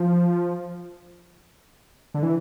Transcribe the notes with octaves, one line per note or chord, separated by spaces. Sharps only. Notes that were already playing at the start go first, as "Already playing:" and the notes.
Already playing: F3
D3
E3